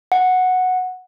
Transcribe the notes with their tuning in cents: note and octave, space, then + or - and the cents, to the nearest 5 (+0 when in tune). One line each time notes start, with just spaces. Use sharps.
F#5 -5